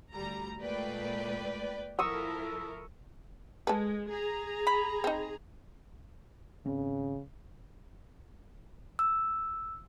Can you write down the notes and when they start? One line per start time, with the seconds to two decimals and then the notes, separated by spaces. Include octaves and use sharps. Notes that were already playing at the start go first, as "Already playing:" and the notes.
0.13 D2 G3 A#5
0.61 A#2 G#3 A3 B4 D5 G5
1.99 F3 E4 A4 A#4 C#6 D#6 E6
3.67 G#3 A4 B4
4.10 G#4 A#5
4.67 B5
5.04 C4 D#4
6.66 G#1 C#3 C4 C#4
8.99 E6